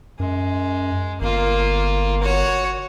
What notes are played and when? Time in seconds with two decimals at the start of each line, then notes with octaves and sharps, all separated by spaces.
0.20 F#2 G#3
1.21 G1 A#3 F4
2.22 F#4 C#5